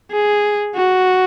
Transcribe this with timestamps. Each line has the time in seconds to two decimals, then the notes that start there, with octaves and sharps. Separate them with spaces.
0.12 G#4
0.75 F#4